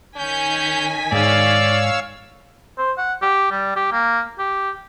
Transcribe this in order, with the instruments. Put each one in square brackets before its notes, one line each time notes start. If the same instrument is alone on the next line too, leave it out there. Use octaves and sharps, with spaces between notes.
[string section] D#3 G#5 B6 [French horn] C#4 [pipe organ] G6
[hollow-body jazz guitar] G#2 [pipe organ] C#5 F5 E6 [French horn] D5
[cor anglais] C5
F#5
G4
G3
G4
A#3
G4